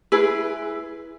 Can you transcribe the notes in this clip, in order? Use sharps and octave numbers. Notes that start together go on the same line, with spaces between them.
E4 G#4 B4